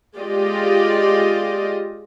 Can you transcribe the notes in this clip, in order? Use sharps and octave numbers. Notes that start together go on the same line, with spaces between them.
G#3 F4 G4 D5 D#5